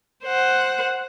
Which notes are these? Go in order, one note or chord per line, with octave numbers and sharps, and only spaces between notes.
C5 F#5